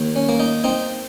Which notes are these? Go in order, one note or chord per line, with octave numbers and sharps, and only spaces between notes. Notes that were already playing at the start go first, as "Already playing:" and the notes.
Already playing: D#2
C#4
A#3
D#4
C4 D#4